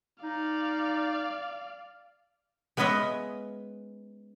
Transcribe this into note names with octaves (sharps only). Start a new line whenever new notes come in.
D#4 D5 F5
G#3 B3 C#4 B4 D#5 E5